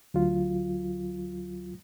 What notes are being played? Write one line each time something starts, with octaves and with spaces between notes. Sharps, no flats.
D2 F#3 F4